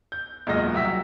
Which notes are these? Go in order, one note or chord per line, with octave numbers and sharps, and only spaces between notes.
G6
E1 F#2 A#2 G#3 D#5 A#6
C2 F#3 E5 G5 E6 B6